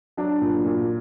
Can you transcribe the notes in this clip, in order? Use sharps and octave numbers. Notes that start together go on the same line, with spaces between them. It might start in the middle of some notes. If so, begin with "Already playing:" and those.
F#3 D4
A#2
A#2